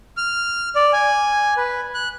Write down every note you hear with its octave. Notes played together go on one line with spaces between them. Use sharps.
F6
D5
G#5
B4
F#6